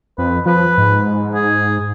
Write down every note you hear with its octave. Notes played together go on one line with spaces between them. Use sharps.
F2 B4
F3 B4
G#2
G#4